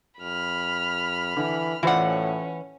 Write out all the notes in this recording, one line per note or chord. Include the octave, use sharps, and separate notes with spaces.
F2 B5 F6
D3 E3
A2 E3 C#4 F4 C5 D5 F#5